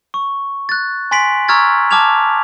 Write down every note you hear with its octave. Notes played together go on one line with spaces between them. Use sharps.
C#6
F#6 A6
G#5 C6 A6 B6 D7 F#7
A#5 C#6 E6 F6 G#6 A6
A5 D6 F6 G#6 F7